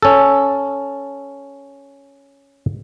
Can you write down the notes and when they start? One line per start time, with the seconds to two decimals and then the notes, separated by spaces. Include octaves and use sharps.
0.02 C#4 A4